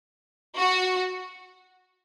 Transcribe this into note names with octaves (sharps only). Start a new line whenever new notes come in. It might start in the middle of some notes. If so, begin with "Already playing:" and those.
F#4